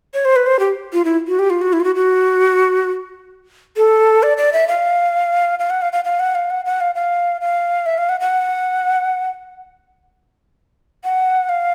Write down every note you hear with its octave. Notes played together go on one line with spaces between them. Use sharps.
C#5
C5
B4
C5
G4
F4
E4
F#4
G4
F4
F#4
E4
F4
F#4
F#4
A4
D5
D5
E5
F5
F5
F#5
F5
F5
F5
F#5
F5
F#5
F#5
F5
F5
F5
E5
F5
F#5
F#5
F#5
F5